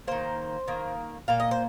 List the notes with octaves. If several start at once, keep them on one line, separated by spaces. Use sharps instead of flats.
D#3 A#3 C5
D#3 A#3
A#2 A#3 F5
D#5
C5